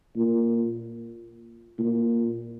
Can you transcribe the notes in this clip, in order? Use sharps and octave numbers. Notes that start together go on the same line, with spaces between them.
A#2
A#2